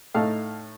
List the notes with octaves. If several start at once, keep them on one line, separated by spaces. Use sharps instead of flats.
A2 A3 D#4 F5 A5